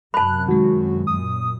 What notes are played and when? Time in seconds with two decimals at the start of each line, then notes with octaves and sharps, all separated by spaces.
0.14 F#2 C3 A5 B5 F#6
0.48 D#3 G#3 F#4
1.07 F#2 A#2 D#6